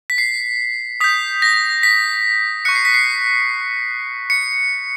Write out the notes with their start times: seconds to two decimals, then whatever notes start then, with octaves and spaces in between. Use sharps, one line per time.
0.10 B6
0.18 C7
1.01 D#6 G6 B6
1.42 A#6
1.83 B6
2.65 C#6 F#6 C#7
2.75 C7
2.85 B6
2.94 C7
4.30 C#7